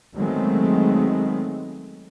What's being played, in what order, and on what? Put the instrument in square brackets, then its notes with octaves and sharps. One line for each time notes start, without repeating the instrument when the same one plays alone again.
[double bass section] D#3 F#3 G#3 A3 B3 C4